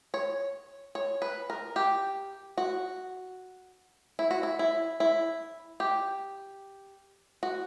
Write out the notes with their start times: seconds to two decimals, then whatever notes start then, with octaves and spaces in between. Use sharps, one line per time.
0.14 C#5
0.95 C#5
1.22 B4
1.50 A#4
1.76 G4
2.58 F#4
4.19 E4
4.31 F#4
4.43 E4
4.59 E4
5.00 E4
5.80 G4
7.43 F#4